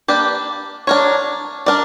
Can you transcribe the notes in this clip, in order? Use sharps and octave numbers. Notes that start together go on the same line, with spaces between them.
A#3 D4 G4 B4 D5
D4 A#4 C#5
D4 A#4 D5